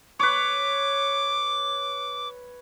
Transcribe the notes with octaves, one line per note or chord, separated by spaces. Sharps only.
B4 C#5 D6